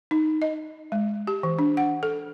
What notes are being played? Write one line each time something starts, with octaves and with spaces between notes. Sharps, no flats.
D#4
D#5
G#3
G4
E3
D4
F#5
A4